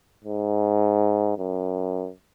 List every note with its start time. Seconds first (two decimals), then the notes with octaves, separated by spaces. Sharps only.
0.24 G#2
1.38 F#2